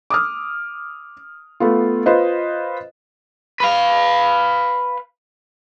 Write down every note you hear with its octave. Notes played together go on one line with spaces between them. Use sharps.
D6 D#6 F6
A3 B3 F4
F4 B4 C5 D#5
B4 F5